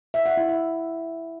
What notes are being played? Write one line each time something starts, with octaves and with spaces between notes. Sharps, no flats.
E5
F#5
E4
E5